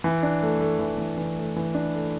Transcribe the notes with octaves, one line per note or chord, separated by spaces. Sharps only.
E3
D4
A3
A3
E3
E3
E3
A3
E3
D4
A3